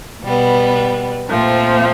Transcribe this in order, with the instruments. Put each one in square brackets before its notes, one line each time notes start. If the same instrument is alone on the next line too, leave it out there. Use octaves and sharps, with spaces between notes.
[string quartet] B2 G3 B3
A#2 F3 A3 C4